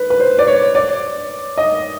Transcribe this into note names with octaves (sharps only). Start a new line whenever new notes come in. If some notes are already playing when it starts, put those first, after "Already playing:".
Already playing: B4
B4
C5
D5
C#5
D5
D#5